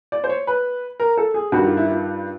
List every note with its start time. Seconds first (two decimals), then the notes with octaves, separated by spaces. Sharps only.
0.12 D5
0.24 C5
0.29 C#5
0.47 B4
1.00 A#4
1.17 A4
1.34 G#4
1.52 G2 D#3 G3 F#4
1.65 F4
1.77 E4
1.90 F4